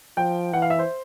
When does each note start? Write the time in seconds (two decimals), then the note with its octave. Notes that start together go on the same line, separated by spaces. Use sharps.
0.17 F3 G5
0.52 E3 F#5
0.62 F5
0.70 E5
0.79 C5